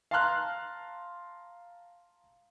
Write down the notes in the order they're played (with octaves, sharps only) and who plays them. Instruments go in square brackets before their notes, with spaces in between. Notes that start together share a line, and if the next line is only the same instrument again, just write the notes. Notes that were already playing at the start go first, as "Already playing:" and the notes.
[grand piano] F5 A5 A#5 C6 F6 F#6